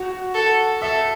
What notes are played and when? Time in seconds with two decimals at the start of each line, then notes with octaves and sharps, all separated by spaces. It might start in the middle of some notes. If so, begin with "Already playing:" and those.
Already playing: F#4
0.34 A4
0.82 A4 E5